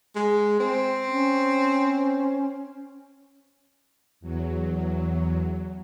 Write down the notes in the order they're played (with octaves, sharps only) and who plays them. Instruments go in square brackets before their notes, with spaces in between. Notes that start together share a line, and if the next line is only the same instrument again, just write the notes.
[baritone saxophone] G#3
C4
[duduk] C#4
[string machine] E2 F#3